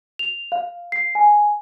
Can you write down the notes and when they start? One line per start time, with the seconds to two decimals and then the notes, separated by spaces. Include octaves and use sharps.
0.19 F7
0.52 F5
0.92 C7
1.15 G#5